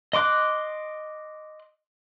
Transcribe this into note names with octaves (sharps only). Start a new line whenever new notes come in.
D#5 C6 D6 F#6